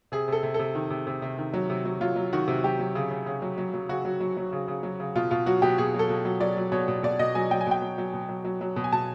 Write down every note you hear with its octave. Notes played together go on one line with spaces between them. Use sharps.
C3 G#4
C3 A4
C3
C3 A4
D#3
C3
C3
C3
D#3
F#3
C3
F#3
F#3 F4
F#3
D#3 F#4
C3
F#3 G4
F#3
C#3
C#3
C#3
F#3
F#3
F#3
C#3 F#4
F#3
F#3
F#3
C#3
C#3
F#3
C#3
B2 F4
B2 F4
F#3 F#4
B2 G4
B2 G#4
F#3
A4
B2
F#3
F#3 D5
F#3
B2 C#5
B2
B2 D5
B2 D#5
F#3 G#5
F#3 G5
G#5
B2 G5
F#3
F#3
B2
F#3
F#3
F#3
B2
G#5
B2 A5